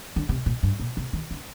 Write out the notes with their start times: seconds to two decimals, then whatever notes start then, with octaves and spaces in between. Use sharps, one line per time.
0.16 D3
0.29 C3
0.46 A#2
0.63 G2
0.80 A#2
0.97 C3
1.13 D#3
1.31 D3